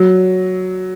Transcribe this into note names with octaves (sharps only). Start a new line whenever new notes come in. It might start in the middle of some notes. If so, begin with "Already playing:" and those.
Already playing: F#3